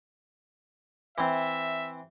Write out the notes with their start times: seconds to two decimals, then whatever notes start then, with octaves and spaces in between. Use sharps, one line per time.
1.18 E3 C4 E5